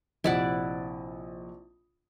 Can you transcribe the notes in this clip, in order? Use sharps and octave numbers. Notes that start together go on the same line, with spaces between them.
A#1 C3 E4 D5 D#5 F#5